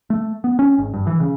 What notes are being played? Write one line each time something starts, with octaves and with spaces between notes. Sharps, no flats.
A3
B3
C#4
G#1
G2
E3
C#3